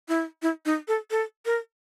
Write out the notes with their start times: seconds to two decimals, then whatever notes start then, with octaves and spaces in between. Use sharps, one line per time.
0.08 E4
0.42 E4
0.66 D#4
0.88 A4
1.11 A4
1.46 A#4